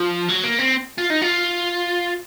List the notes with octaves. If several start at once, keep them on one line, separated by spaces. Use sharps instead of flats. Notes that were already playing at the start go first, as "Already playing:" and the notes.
Already playing: F3
F#3
A#3
C4
F4
D#4
F4